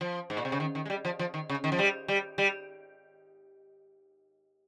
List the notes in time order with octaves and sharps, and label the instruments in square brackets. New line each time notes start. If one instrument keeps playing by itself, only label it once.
[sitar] F3
G#2
A#2
C3
C#3
D#3
D#3
G#3
G3
F3
F3
D#3
C#3
D#3
F3
G3
G3
G3